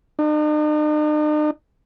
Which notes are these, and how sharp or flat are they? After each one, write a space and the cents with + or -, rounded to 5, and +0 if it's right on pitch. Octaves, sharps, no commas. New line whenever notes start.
D#4 -45